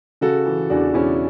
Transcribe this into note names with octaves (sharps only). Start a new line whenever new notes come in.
C#3 F#4 A4
E3
E2 D4 F#4
E2 C#4 E4